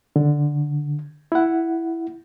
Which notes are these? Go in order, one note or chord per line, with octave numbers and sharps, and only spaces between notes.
D3
E4 F#5